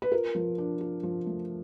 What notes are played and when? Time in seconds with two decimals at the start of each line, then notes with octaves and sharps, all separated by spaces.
0.02 B4
0.12 F4 A#4
0.35 F3
0.58 D4
0.81 F4
1.03 F3
1.26 A3